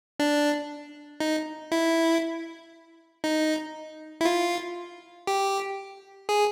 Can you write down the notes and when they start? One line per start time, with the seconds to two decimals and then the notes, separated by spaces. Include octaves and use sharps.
0.20 D4
1.20 D#4
1.72 E4
3.24 D#4
4.21 E4
4.25 F4
5.27 G4
6.29 G#4